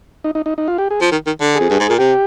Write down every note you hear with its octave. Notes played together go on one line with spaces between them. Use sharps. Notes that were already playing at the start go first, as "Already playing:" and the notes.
D#4
D#4
D#4
D#4
F4
G4
G#4
F3
D#3
D#3
D3
F2 G#4
G2
G#2
A#2
C3 G4